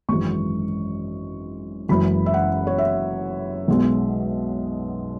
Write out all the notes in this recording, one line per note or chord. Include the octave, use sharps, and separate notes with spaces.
G#1 F#2 E3 G#3 C#6
F#1 F#2 E3 G#3 B5
E5
F#5
C#5
E5
B1 B2 G#3